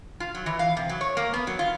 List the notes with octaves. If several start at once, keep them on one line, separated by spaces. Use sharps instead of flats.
F4
F#3
E3
F5
C3
F#3
C#5
A#3
B3
F#3
F4